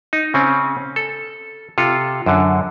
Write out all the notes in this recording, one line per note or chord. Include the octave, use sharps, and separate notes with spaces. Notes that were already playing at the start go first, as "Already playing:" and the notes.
D#4
C#3 C4 C#4
A4
C3 F4 A4
F#2 D3